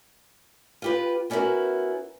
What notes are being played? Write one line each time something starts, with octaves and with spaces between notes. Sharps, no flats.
F4 G4 B4
B3 C#4 D4 E4 F#4 A#4